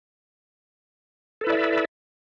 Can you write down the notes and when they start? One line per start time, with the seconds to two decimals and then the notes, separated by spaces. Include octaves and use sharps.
1.41 A4
1.44 B4
1.47 E4
1.50 D5
1.52 E5